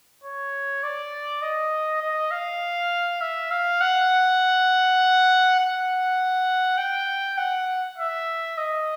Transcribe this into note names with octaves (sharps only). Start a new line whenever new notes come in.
C#5
D5
D#5
D#5
F5
E5
F5
F#5
F#5
G5
F#5
E5
D#5